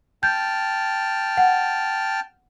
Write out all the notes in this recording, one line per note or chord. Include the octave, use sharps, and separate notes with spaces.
G5 A5 F6 G6
F#5